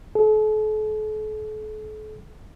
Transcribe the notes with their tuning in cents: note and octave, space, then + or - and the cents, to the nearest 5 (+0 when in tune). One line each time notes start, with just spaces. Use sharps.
A4 -40